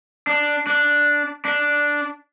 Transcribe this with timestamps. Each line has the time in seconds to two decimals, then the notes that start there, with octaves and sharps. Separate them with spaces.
0.27 D4
0.67 D4
1.45 D4